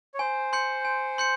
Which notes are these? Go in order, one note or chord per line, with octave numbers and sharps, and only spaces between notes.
C#5
C5 G#5
C6 G6 C#7
G#5
C6 G6 C#7